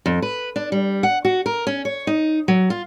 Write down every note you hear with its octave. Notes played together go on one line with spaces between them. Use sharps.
F2
B4
D4
G3
F#5
F#4
A#4
C#4
C#5
D#4
F#3
F4